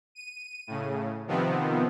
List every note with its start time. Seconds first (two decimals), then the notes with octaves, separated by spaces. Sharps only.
0.15 D#7
0.67 A2 C#3
1.27 C3 D#3 F3 B3 C4